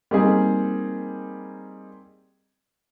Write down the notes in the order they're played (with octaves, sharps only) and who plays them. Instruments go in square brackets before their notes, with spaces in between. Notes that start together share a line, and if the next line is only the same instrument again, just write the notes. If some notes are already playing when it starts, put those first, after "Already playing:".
[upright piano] G3 A#3 C4 D#4 G#4